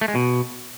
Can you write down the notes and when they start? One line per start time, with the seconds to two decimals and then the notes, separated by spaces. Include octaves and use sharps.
0.01 A3
0.08 G#3
0.15 B2